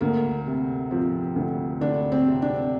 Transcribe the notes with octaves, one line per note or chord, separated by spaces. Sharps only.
D2 A#3
C3
F3 C4
D2
D2 D4
C4
C3
D4